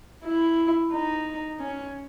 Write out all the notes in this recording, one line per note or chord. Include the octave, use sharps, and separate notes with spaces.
E4
D#4
C#4